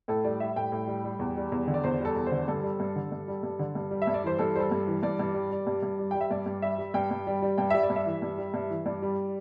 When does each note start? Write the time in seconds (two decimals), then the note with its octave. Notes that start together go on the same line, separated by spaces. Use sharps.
0.08 A2 A4
0.24 G3 D5
0.40 G3 E5
0.56 A2 G5
0.72 A2
0.88 G3
1.04 G3
1.19 E2
1.37 G3
1.52 E2
1.68 D3
1.74 D5
1.84 E2 C5
2.00 G3 A4
2.16 E2
2.26 C5
2.32 D3
2.48 G2 A4
2.63 G3
2.80 G2
2.96 D3
3.12 G2
3.28 G3
3.43 G2
3.59 D3
3.75 G2
3.91 G3
4.02 E5
4.07 G2
4.14 D5
4.24 E3 C5
4.39 G2 A4
4.55 G3 C5
4.60 A4
4.71 G2
4.87 E3
5.03 G2 D5
5.19 G2
5.34 G3
5.51 G3
5.67 G2
5.83 G2
5.99 G3
6.11 G3 G5
6.21 E5
6.31 G2 D5
6.46 G2
6.62 G3 E5
6.78 G3
6.94 G2 G5
7.11 G2
7.27 G3
7.42 G3
7.58 G2 G5
7.70 G3 E5
7.83 D5
7.90 G2
7.96 E5
8.06 E3
8.22 G2
8.38 G3
8.54 G2
8.70 E3
8.86 G2 D5
9.02 G3